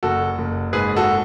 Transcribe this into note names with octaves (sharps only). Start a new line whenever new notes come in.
F#1 F#4 A4
F#1
G#2 G#4 B4
F#4 A4